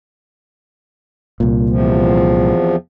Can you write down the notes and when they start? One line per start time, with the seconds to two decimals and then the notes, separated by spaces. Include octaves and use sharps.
1.40 C2 A#2
1.69 E2 C3 F3